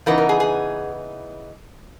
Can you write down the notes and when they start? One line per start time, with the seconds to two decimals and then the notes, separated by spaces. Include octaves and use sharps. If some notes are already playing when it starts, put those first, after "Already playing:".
0.06 C#3 E3 B3 D#4 A#4
0.18 A#4
0.29 G#4
0.40 G#4